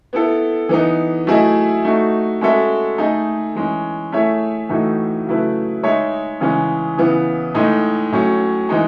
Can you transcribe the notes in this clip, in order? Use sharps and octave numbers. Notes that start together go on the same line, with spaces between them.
B3 E4 A4
E3 B3 D#4
F#3 A3 E4 G#4 D#5
A3 D#4 F#4
G#3 C#4 F#4 A4 E5
A3 D#4 G#4 D#5
E3 G#3 C#4
A3 E4 G#4 C#5 E5
A2 E3 A3 D#4 F#4
C#3 F#3 A3 E4 B4
G#3 D#4 G#4 C#5 E5
C#3 E3 G#3 C#4 G#4
C#3 E3 B3 E4
A2 G#3 D#4
A2 F#3 C#4
E3 G#3 D#4